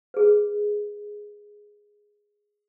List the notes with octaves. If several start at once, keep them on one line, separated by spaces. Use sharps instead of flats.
G#4 B4